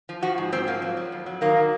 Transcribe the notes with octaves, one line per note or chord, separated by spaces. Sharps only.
F3
F3 F#4
G#2
G#2 C4
F3 A#3
F#3
F#3
F2
F#3
D#3 A#3
F#3